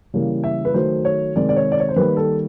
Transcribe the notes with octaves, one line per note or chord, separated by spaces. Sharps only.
C#3 E3 G3 A#3
E5
B4
D#3 F#3 A3 C5
C#5
C3 D#3 G#3 D5
D5
C#5
D5
C#5
C5
D#3 G3 A#3 B4
A4